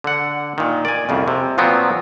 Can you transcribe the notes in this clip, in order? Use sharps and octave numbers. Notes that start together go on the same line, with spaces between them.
D3 F#5
A#2 D#3
D5 G#5
C2 F2 C#3
C3
A#2 F3 F#3 B3 C4